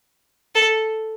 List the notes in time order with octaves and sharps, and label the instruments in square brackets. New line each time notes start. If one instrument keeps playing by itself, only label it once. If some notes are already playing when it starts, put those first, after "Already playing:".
[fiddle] A4